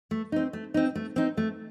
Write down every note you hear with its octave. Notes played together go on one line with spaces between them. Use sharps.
A3
C4 D#4
A3
C4 D#4
A3
C4 D#4
A3